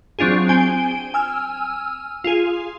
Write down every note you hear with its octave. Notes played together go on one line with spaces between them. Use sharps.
F#3 C4 D4 F4 G#4
C4 G#5 D7 G7
G#5 E6 F6
F4 G#4